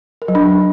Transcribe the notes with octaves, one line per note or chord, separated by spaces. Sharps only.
A#4
F#3
D4